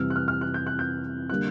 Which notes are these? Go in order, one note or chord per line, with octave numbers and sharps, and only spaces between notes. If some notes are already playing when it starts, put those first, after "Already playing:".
Already playing: F2 C3 E3 G3 E6 F6
F#6
F6
F6
F#6
G6
F#6
G6
D3 G3 A#3 F#6